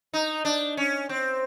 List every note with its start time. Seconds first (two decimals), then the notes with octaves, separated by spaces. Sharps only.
0.13 D#4
0.45 D4
0.77 C#4
1.09 C4